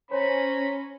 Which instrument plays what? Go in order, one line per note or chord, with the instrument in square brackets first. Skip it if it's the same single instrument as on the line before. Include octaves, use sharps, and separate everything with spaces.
[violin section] C#4 [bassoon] C5 [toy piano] C#5 [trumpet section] A#5 B5